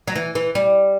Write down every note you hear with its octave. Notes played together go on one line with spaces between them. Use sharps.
F#3
E3
E3
G3